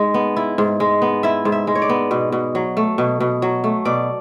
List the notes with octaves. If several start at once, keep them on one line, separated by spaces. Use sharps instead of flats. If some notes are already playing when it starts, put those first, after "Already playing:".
Already playing: G#2 G#3
B3
E4
G#2
G#3
B3
E4 E5
G#2
E5
G#3
C#5
D5
B3
B2
B2
F#3
A3
B2
B2
F#3
A3
B2 D5